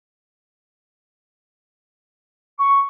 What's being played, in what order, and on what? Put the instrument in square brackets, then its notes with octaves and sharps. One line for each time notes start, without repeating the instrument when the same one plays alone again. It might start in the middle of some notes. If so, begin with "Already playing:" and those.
[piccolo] C#6